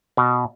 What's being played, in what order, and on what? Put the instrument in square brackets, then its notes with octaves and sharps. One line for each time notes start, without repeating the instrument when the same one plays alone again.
[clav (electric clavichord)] B2